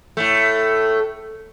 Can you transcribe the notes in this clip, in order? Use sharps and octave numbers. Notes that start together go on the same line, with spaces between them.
A2 A3